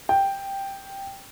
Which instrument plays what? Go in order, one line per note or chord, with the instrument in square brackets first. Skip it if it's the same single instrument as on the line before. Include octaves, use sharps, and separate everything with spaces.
[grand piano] G5